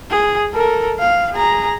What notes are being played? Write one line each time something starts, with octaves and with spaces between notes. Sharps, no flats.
G#4
A4 A#4
F5
G#4 A#5